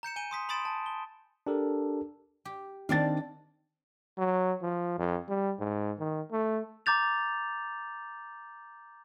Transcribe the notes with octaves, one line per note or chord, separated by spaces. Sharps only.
A#5 G6 C#7 E7
G#5 G6 D#7 G7
C6 D#6 B6
B5 C6 D#6 A6 D7 E7
A5
G7
D4 G4 A4 A#4
G4
D#3 C4 D4 D5 F5 A6
F#3
F3
F2
G3
G#2
D#3
A3
A#5 D6 G6 A6 F7